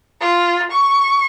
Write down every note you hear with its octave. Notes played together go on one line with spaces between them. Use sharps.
F4
C#6